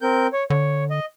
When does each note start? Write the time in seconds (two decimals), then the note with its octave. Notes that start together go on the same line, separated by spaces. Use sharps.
0.01 C4 A#4 G6
0.33 C#5
0.50 D3 C#5
0.90 D#5